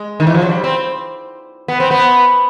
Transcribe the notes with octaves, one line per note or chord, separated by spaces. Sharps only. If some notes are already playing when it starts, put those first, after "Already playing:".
Already playing: G#3
D#3
E3
F3
F#3
G3
C4
B3
C4
B3